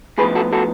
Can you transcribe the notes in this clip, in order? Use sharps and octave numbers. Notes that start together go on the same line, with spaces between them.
A2 F3 B3 G#4 B4
F#4 A4
F#4 A4